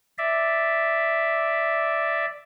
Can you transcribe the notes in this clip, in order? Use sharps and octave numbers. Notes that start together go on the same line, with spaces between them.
D5 E5